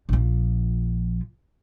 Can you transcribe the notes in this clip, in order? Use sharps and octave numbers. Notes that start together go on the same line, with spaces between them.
A#1 F3